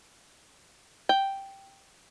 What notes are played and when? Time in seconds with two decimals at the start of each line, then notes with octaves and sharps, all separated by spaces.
1.09 G5